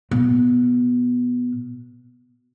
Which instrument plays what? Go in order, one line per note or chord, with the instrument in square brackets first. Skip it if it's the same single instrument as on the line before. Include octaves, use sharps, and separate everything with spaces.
[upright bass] B2